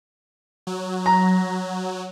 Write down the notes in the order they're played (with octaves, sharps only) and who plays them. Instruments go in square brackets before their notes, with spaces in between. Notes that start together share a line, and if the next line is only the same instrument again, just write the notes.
[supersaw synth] F#3
[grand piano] A#5